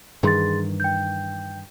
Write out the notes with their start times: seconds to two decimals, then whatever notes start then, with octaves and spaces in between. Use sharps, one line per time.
0.23 G2 D#3 E3 G#4 C6 A6
0.80 G5 G6